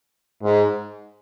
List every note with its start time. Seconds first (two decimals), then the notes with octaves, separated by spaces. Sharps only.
0.43 G#2